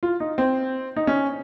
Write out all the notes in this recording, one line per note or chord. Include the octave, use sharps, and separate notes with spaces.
F4
D#4
C4
D#4
C#4